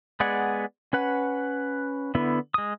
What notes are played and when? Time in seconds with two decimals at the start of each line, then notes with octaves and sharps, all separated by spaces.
0.20 G#3 B3 G#4 D5 F#5
0.93 C#4 B4 F#5
2.15 D3 B3 E4
2.54 G#3 D#6